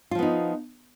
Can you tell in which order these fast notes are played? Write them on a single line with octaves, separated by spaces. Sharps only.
F4 F3 B3 D#4